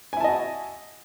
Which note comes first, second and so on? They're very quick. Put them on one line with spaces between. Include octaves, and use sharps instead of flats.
G#5 E4 A5 D#5 F#4